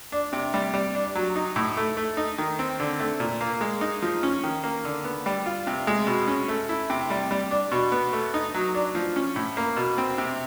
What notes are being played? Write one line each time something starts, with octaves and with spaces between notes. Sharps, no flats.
D4
C3
G3
G3
D4
F#3
D#4
A2
A3
A3
D#4
D#3
C4
D3
A3
A#2
A#3
G#3
D#4
F3
C#4
D#3
A#3
D3
B3
G3
F4
C3
G#3
B2
C#4
A3
E4
C3
G3
G3
D4
B2
B3
A3
D#4
F#3
D4
F3
C#4
A2
A#3
B2
C4
C3